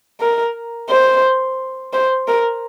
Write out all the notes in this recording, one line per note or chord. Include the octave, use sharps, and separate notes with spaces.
A#4
C5
C5
A#4